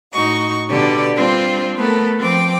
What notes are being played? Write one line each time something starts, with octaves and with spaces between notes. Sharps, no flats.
A2 D#4 F#4 C#6
B2 D3 G4 B4 D5
G3 C4 D4 F4
A3 B3 A4 A#4
F3 C4 G5 D6